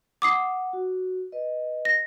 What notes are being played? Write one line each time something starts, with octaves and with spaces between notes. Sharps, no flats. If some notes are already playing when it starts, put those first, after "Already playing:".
F#5 D6 D#6 C7
F#4
B4 D#5
A#6